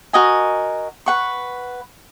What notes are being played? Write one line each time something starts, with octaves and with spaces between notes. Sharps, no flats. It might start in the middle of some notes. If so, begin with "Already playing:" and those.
F#4 A#4 D#5 G#5
B4 F#5 C#6